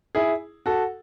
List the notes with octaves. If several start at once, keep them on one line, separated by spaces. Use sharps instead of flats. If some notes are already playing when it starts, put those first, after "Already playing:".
E4 G#4
F#4 A4